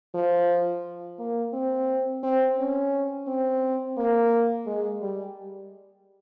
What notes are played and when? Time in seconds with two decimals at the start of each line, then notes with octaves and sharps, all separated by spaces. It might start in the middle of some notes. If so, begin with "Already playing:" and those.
0.14 F3
1.19 A#3
1.54 C4
2.23 C4
2.59 C#4
3.27 C4
3.97 A#3
4.66 G#3
5.01 G3